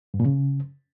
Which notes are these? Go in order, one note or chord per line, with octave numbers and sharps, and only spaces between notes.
G2
A#2
C#3